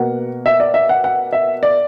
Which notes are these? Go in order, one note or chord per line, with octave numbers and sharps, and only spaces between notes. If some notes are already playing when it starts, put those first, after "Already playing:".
Already playing: B2 A#3 F#5
E5
D5
E5
F#5
F#5
E5
D5